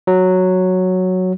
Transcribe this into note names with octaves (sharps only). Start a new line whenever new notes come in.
F#3